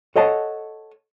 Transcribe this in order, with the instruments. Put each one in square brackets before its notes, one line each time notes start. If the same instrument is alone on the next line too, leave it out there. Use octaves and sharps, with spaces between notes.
[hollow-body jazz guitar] A4 C#5 D#5 F#5 A5